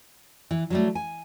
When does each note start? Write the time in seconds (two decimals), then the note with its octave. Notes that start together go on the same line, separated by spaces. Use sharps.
0.51 E3
0.70 F#3 G3 A3
0.95 G#5